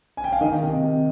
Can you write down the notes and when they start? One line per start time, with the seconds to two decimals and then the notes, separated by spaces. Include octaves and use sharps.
0.17 G#5
0.24 G5
0.33 F5
0.41 D#3 D#5
0.63 C3
0.84 C3